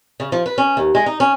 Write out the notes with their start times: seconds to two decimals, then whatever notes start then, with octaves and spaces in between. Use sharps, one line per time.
0.20 C#3
0.32 F3
0.46 B4
0.58 C#4
0.77 D#2
0.95 G#3
1.06 D#4
1.20 C#4